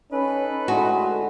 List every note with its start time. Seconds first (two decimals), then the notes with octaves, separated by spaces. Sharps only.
0.12 C#4 D#4 A4 B4
0.68 A2 D3 G#3 F#4